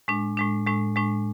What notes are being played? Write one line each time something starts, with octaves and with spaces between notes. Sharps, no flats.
A2 G#3 D4
A2 G#3 D4
A2 G#3 D4
A2 G#3 D4